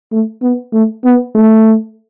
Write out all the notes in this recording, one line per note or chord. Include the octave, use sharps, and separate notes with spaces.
A3
B3
A3
B3
A3